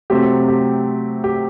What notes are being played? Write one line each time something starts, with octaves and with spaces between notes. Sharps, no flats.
C3 F#3 A3 C4 G4
G4
G4